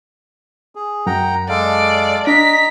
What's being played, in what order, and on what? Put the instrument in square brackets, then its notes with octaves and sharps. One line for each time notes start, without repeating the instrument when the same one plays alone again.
[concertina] G#4
[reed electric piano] F#2 [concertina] F#5 G5 A#5
[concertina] G#3 A4 F5 [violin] D5
[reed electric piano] D4 [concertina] D#5 A#5 [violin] B6